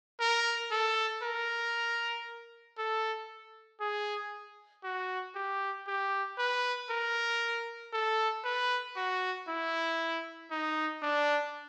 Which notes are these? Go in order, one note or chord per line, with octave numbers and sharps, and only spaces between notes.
A#4
A4
A#4
A4
G#4
F#4
G4
G4
B4
A#4
A4
B4
F#4
E4
D#4
D4